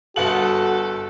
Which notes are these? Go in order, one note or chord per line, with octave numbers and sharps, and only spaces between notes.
G1 F#4 A4 F#5 F#7